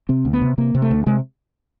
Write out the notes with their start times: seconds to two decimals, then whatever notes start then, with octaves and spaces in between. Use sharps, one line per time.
0.09 C3 C4
0.25 D2
0.33 B3
0.42 C3
0.58 C3 A#3
0.75 C3
0.82 A3
0.91 D2
1.06 C3 G#3